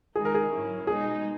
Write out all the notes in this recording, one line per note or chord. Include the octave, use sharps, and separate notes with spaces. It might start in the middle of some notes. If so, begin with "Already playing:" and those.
D#3 G#3 D#4 G#4
A#4
G#4
G#2 F#3 C#4 E4
B2 G#3 D#4 G#4